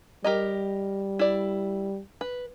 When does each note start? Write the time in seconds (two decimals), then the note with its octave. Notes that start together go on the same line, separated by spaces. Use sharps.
0.24 G3 G4 A#4 D#5
1.19 E4 D5
2.21 B4